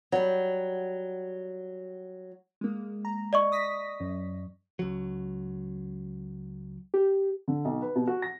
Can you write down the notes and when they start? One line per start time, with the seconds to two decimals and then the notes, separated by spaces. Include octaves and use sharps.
0.12 F#3 G3
2.61 G#3 A#3
3.05 A#5
3.33 D5 D#5 C#6
3.52 D#6 A#6 B6
4.00 F#2
4.79 C#2 F#3
6.94 G4
7.48 D3
7.65 B1
7.82 B4
7.96 B2
8.07 F#4
8.22 A#6